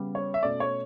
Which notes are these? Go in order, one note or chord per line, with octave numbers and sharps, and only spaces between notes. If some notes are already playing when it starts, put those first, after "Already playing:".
Already playing: C#3 G3 B3
C#5
E5
B2 A3 C#4 D5
C#5